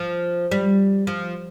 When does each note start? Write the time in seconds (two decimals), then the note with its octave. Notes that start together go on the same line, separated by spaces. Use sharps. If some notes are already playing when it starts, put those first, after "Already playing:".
Already playing: F3
0.51 G3
1.07 F3